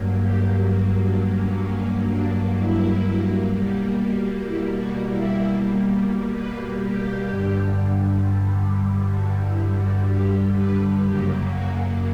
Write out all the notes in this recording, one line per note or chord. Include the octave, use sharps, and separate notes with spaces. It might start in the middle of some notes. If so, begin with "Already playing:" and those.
Already playing: G2 F#3 A#3
G4
F#4
D4
C#4
C#4
D4
E4
B2 G3 A#3
E4
F#4
E4
B4
G4
G2 D3 G3
F#4
E4
F#4
G4
B4
F#2 C#3 F#3 A#3 G4
F#4